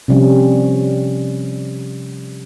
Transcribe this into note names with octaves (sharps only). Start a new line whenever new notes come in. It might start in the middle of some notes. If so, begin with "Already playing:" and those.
C3 F3 G3 C#4